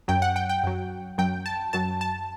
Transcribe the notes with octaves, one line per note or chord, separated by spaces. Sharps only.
F#2 F#3 G5
F#5
G5
G5
F#2 F#3
F#2 F#3 G5
A5
F#2 F#3 A5
A5